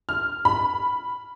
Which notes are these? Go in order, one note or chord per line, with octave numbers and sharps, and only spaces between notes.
F6
B5